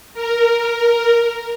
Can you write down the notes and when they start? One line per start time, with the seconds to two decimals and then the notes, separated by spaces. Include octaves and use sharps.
0.13 A#4